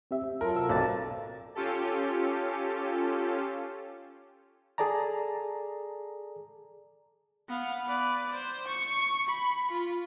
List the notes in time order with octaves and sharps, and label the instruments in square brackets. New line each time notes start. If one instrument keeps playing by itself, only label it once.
[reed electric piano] C4 G4 E5
E5
[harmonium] F#3 F4 A4 [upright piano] A#4
[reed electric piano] C3 C5 E6
[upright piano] B1 [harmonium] C4 D5 A5 [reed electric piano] A4 D6 A6
[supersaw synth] C#4 F4 G4 A4
[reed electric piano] G#4 A4 D5 A5 A#5
[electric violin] B3 F5
B4 D5
C5
C#6
B5
F4